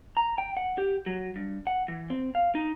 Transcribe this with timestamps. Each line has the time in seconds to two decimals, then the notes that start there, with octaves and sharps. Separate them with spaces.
0.17 A#5
0.38 G5
0.57 F#5
0.78 G4
1.06 F#3
1.36 G2
1.67 F#5
1.88 E3
2.10 C4
2.35 F5
2.55 D#4